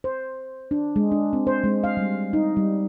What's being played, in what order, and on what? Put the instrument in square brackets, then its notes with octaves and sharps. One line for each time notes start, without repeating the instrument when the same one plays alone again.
[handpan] C5
D4
G#3
D4
C4
C5
G#3
F5
G3
D#4
G3